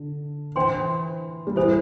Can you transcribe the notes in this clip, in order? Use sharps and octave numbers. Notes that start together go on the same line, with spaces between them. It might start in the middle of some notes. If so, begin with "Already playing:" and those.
Already playing: D3
E3 D4 C5 G5 C6
G3
E3 E4 A4 C5